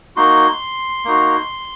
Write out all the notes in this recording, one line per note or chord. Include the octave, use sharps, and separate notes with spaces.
A#3 D#4 F#4 C6
A#3 D#4 F#4